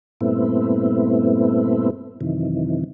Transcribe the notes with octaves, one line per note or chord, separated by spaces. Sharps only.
G2 A#2 A3 B3 C4 E4
F#2 C3 D#3 E3